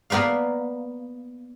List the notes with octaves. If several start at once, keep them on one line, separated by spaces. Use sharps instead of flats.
A#3 B3 B4 D5 F5